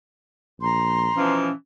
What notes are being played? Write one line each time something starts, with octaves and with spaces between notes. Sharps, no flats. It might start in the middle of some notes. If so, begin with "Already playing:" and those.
A#1 A#5 C6
B2 E3 F3 C#4